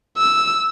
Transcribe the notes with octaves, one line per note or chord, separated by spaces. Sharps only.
E6